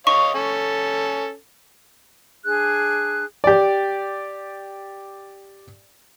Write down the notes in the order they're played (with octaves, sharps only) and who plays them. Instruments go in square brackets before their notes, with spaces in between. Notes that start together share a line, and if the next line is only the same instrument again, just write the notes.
[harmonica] C#5 D#5 F5 [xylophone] C#6
[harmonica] C#4 A4
[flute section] D4 G#4 F#6
[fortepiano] G4 D5